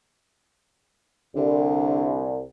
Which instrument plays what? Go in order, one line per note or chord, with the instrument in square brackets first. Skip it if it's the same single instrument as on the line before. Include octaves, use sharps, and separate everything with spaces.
[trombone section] C2 [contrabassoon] D3